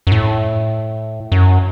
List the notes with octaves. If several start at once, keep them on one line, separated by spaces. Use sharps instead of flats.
F#2
A2
F#2